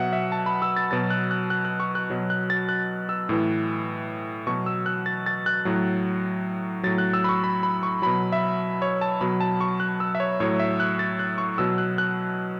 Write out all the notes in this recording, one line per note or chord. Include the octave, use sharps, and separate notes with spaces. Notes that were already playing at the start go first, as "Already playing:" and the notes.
Already playing: B2 F#3 E5 F#5
E5
A5
B5
E6
A6
B2 F#3 A6
F#6
F#6
F#6
F#6
C#6
F#6
B2 F#3
F#6
A6
F#6
E6
A2 E3
B2 F#3 C#6
E6
F#6
A6
A6
F#6
A2 F#3
A2 F#3 A6
F#6
E6
B5
C#6
B5
B5
C#6
B2 F#3 B5
E5
C#5
A5
B2 F#3 B5
A5
C#6
F#6
E6
E5
C#5
A2 F#3 C#5
E5
F#6
A6
F#6
C#6
B2 F#3 E6
F#6
F#6